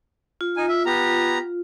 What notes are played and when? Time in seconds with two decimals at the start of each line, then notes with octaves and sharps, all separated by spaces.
0.41 F4
0.57 D#4 G#5
0.68 E5
0.86 B3 G4 A#5